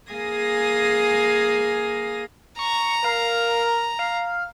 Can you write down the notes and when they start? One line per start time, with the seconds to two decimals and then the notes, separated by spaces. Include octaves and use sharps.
0.12 A#3 G#4 F5 G#5 D#6 A#6
2.59 A#5 C#6
3.04 A#4 F5
3.99 F5